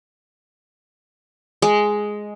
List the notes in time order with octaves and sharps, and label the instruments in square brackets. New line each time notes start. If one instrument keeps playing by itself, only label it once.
[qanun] G#3